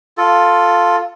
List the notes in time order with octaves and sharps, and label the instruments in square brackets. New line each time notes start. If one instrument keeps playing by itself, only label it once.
[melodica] F4 A4